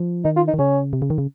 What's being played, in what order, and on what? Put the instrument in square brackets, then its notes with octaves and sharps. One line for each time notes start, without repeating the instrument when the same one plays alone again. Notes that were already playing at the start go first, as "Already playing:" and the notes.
Already playing: [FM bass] F3
[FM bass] D#3 [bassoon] D#4
[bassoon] F4
D#4
[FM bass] D#3
[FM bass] C#3 [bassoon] C#4
[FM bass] C3
C#3
D#3
C#3